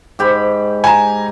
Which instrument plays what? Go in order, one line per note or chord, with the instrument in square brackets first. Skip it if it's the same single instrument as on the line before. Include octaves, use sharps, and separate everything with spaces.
[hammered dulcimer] G#2 G4 B5
[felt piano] G#5 A#5